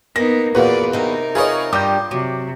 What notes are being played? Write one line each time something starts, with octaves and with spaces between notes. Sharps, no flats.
A#3 B3 D#4 A#6
E2 A#2 F4 F#4 B4 D5
C3 D#4 A#4
F4 G#4 B4 C#5 D#5
G2 G3 A#5 D6 G6
C3 F#3